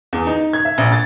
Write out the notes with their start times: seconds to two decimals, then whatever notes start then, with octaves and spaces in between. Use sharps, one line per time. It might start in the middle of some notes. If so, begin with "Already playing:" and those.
0.13 E2
0.27 D#4
0.53 G#6
0.65 E5
0.78 A#1
0.92 A6